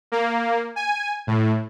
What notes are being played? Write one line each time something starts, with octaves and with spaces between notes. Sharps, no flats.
A#3
G#5
A2